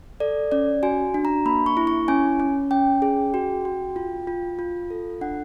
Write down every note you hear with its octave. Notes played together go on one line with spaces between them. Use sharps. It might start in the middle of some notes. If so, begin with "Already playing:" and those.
A4 D5
C#4 D5
F#4 G#5
D4
A#5
A#3 B5
C#6
E4
C#6
C#4 G#5
C#4
C#4 G5
G#4
F#4
F#4
F4
F4
F4
A4
D4 F#5